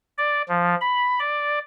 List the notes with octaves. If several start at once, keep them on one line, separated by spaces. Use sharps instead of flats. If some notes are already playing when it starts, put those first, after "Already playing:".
D5
F3
B5
D5